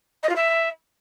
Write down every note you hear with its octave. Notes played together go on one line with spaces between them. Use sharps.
D#5
F4
E5